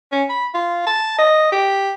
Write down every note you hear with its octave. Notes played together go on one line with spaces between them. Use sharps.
C#4
B5
F4
A5
D#5
G4